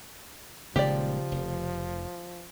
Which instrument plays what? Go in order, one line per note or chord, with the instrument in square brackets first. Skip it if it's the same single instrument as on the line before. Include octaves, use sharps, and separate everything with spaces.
[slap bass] D#1 D#2 G#3 [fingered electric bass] C#3 [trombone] F3 [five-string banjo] G4 D5
[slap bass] F1